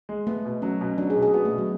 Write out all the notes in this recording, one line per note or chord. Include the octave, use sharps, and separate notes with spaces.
G#3
A3 B3
B2
F#3 C#4
B2
F#3 D4
G#4
B2
G#4
B3 F#4
A3
B2
F#3